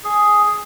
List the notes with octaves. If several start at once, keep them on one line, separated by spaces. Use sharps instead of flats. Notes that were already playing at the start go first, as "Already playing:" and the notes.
G#4